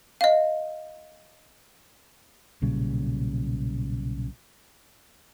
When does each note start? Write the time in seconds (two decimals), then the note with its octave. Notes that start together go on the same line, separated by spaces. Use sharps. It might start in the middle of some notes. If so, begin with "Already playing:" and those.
0.21 D#5 F5
2.62 B1 A#2 C#3 G3